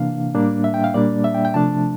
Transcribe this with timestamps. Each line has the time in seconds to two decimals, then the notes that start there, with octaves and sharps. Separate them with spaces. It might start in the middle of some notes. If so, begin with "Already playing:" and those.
Already playing: C3 E3 A#3 D4 F5
0.34 A2 G3 A#3 D4
0.64 E5
0.74 G5
0.84 F5
0.94 A#2 G3 A#3 D4 D5
1.24 E5
1.34 G5
1.45 G5
1.54 C3 F3 A3 D4 A5